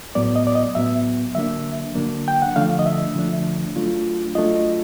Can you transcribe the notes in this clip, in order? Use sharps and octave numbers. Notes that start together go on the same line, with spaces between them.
A2 F#3 B3 D5
D#5
D5
D#5
A2 F#3 B3 E5
D3 F#3 A#3 D4 E5
D3 F#3 A#3 D4
G5
F#5
D3 F3 A3 D4 F5
D#5
E5
D3 F3 A3 D4
F#3 A3 D4 F4
F#3 A3 D4 F4 D#5